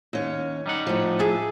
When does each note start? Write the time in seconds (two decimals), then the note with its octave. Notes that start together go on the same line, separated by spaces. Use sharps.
0.13 D#2 C#4
0.66 G3 D#4 F#5
0.87 A2 F3
1.19 G#4 E5 A5